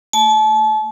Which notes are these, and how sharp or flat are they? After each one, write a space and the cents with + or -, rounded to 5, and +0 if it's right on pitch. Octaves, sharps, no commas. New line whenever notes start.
A3 +40 A5 -35